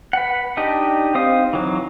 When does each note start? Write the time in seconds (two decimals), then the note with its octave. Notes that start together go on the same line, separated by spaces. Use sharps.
0.13 B4 F#5
0.57 D4 D#4 G4 D#5
1.15 C4 D#4 C5 F5 D#6
1.53 E3 F#3 D#4